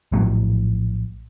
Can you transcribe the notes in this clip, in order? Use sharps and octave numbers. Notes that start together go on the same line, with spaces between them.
A#1 A2 F#3